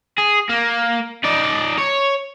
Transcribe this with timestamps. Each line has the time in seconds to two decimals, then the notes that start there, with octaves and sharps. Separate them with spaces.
0.18 G#4
0.50 A#3
1.24 D#4 D5
1.78 C#5